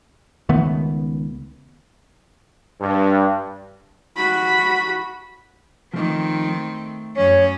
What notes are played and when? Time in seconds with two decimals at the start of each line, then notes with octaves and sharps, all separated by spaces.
0.49 C#2 D#3 A3 B3
2.80 G2
4.17 F#4 B5
5.94 D#3 F3 A3 C4 D#4
6.47 A3
7.16 F#2 C#4 C#5